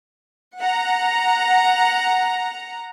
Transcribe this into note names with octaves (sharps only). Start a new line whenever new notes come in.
F#5 A#5